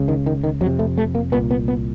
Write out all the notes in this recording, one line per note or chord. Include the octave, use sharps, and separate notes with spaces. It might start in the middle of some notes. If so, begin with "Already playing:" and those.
Already playing: C#2 C#3
D#3
D#3
D#3
F2 F#3
C3
A3
A3
A#3
C2 A#2 B3
B3
B3